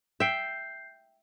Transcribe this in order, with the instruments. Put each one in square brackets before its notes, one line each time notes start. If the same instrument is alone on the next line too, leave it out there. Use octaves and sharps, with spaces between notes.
[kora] E5 G5 [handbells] G6 C7